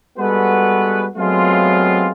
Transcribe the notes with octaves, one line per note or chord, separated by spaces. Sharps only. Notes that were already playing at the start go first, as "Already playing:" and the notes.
G3 G#3 B3 F#4 A4 B4
F#3 G#3 A3 B3 C4 F4